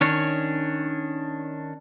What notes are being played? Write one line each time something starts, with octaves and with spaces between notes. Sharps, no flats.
D#3 C#4 D4 C#5